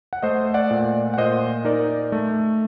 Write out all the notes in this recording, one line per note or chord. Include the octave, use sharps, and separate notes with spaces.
F#5
A3 C5 D#5
D5 F#5
A#2
F#5
A#2 C5 D#5
D#4 A#4 D5
A3